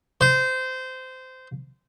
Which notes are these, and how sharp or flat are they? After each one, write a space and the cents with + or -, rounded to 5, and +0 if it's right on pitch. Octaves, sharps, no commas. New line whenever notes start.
C5 -20